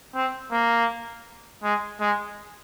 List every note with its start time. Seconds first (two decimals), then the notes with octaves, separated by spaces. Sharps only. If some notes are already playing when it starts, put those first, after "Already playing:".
0.15 C4
0.52 A#3
1.63 G#3
2.00 G#3